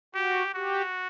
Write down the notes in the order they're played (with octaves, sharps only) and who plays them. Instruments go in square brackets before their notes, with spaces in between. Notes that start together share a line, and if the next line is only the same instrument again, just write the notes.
[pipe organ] F#4 [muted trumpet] G4
[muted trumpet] F#4 [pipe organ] G4